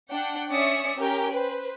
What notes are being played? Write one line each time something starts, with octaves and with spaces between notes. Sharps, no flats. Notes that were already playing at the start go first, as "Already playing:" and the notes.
D4 F#5 G5
C#4 C#5 D5 E5 D#6 C#7
C#4 G4 A#4 G5 G#5
B4 C5